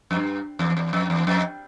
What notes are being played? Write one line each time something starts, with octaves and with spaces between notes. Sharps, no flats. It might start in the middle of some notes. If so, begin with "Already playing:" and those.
F2
G2
E2
E2
F2
E2
F2